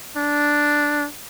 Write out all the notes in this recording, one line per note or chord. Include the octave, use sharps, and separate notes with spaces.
D4